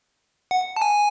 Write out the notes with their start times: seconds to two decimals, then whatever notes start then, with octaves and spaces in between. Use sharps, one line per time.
0.51 F#5
0.76 A5
0.82 G#5